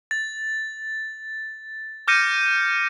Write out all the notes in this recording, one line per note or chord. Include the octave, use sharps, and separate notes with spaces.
A6
D6 F6 G6 A#6 C#7 D#7